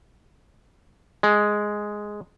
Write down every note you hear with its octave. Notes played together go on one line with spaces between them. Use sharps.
G#3